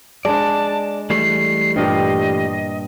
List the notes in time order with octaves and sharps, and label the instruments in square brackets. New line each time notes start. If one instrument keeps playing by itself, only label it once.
[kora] G#3 D4 [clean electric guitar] D5 [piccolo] A5
[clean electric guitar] E3 G3 A3 [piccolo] C7
[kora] G2 A#2 G4 [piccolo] D#5